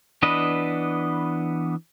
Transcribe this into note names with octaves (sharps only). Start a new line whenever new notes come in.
E3 B3 D4 B4 D#5